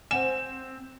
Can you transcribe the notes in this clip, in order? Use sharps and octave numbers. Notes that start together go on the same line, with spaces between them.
C4 C5 F#5 G#5 E7